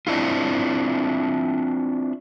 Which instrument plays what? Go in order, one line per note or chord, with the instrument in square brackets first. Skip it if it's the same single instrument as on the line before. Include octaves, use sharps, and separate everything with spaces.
[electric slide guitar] C4 D4 E4 F4